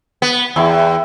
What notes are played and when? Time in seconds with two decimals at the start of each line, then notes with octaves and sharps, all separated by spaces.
0.22 B3
0.56 E2 E4 G5